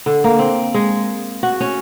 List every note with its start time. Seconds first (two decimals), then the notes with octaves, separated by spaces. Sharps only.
0.06 D3
0.24 A#3
0.39 C4
0.74 G#3
1.43 F#4
1.60 C#4